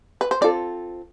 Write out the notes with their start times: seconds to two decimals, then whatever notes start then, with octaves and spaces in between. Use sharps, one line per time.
0.21 B4
0.31 C5
0.41 C4 F4 A4 D5